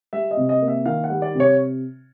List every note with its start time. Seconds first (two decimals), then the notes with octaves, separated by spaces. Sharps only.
0.13 G3 E5
0.31 D#5
0.37 C3
0.49 D#5
0.61 A#3
0.68 E5
0.85 D#3 F5
1.04 F#5
1.10 G3
1.22 D5
1.35 C3
1.40 C#5